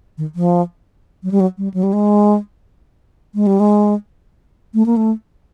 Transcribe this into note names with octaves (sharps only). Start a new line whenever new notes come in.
D#3
F3
F#3
G3
F#3
G3
F#3
G3
G#3
G#3
G3
G#3
A3
A#3
A3